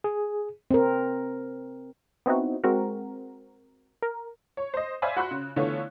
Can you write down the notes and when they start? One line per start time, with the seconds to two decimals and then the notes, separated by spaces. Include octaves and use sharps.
0.04 G#4
0.71 C4 A#4
2.26 B3 C4 D#4 E4 F#4
2.64 G#3 C4 F#4 A#4
4.02 A#4
4.57 C#5
4.74 C5 D#5
5.02 C5 D5 E5 F5 G#5 B5
5.17 F#4 B5 C6 F#6
5.31 C#3
5.56 D3 E3 A3 B3 F4 C#5